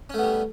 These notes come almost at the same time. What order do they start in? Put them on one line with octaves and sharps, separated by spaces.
C#4 A3 B3 G3